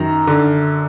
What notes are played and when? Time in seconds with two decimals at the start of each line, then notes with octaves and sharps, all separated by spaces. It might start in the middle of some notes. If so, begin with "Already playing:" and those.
Already playing: F#2 D#3 A#5
0.27 D3